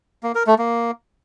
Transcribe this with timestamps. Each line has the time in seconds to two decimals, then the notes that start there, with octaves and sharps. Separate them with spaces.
0.23 A#3
0.35 A#4
0.47 A3
0.59 A#3